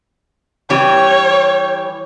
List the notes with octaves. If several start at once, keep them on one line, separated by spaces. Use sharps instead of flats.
E3 G3 G4 C#5